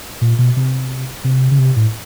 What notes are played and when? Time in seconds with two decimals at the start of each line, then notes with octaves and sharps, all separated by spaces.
0.21 A#2
0.39 B2
0.56 C3
1.24 C3
1.51 C#3
1.59 C3
1.76 A2